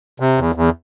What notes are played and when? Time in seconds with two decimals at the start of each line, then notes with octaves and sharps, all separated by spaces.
0.20 C3
0.38 E2
0.55 E2